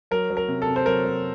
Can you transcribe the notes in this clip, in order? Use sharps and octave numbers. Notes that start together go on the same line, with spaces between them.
F#3 A#4
F#3
A#4
C3
A4
C3
C5
F#3 A#4
F#3